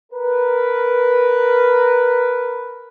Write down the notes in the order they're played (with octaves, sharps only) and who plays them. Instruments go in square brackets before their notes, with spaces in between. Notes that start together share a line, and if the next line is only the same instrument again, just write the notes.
[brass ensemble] A#4 B4